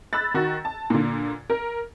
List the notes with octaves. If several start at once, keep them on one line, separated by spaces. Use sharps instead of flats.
B5 E6 F#6 A6
D#3 F#4
A5
A#2 D3
A#4